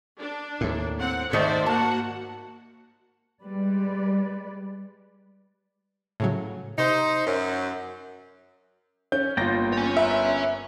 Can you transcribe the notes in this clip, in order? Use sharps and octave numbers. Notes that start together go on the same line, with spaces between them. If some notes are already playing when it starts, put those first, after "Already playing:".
D4
D#2 A2
C4 F#5
G#2 D#3 A3 C5 D5 E5
A#3 F#4 F#5 A5
G3 G#3 B4 D5
A2 C#3 F#3
C3 D#4 C5
F#2
C#4 G6
G1 A#3 F4 G5 A6 A#6
C#5 G#5
A#4 B4 E5